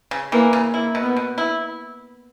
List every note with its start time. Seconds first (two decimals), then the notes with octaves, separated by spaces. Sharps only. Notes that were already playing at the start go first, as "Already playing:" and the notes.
0.11 C#3
0.32 E3 A#3
0.53 C#3
0.74 A#3 E4
0.95 B2
1.02 B3
1.16 B2
1.38 E4